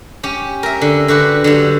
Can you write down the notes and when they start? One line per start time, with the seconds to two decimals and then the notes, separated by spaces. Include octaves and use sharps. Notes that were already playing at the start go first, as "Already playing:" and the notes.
0.23 C#4 G4
0.63 A#4 E5
0.81 D3
1.08 D3 F#4 G4 B4
1.44 D3 F#3 G3